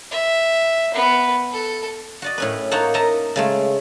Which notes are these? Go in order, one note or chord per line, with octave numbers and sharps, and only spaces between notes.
E5
B3
A4
F#4 D5 D#5
A2 C#4 B4
A#3 D#4 C#5 F#5 A5
A#4 D#5 E5 A5 A#5
C#3 G#3 A3